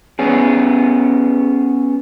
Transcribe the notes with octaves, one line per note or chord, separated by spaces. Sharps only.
B3 C#4 G#4